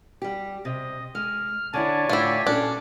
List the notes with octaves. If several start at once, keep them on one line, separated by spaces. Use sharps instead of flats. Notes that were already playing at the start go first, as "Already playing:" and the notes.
G3 G4
C3 D#5
G#3 F6
D3 D4 E4 C#5 D5 G#5 A5
D2 A2 D3 E4 F4 G4
A#2 C#4 D4 A4